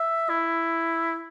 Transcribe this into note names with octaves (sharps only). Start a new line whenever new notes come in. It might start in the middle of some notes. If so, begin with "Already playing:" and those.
Already playing: E5
E4